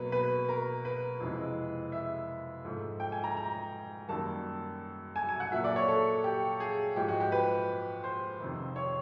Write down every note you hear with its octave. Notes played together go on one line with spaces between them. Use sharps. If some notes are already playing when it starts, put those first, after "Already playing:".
Already playing: B2 F#3 A#3 B4
B4
A#4
B4
F2 C3 E3 G#3
E5
G#2 F3 A3
G5
G#5
A#5
A#5
F#2 D#3 G3 A#3 A5
G#5
G#5
F#5
A#2 F#3 A#3 E5
D5
C#5
A4
G4
G#4
G#2 F3 G#3 G4
F#4
G4
B4
C5
F2 C3 D#3
C#5